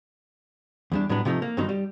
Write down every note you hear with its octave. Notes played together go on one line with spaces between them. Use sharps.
E2 G3 D4
A2 F#3 G3 B3 D4
C3 F3 A3 D#4
A#3
G2 D3 D#3 F#3 D#4
G3